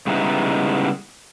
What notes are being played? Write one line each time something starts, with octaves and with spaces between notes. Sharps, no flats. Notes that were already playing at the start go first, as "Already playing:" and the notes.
C#3 G3 G#3 B3 D#4 E4